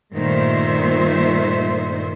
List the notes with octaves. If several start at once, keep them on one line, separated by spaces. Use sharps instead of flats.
G2 A#2 D#3 A3 C5 E5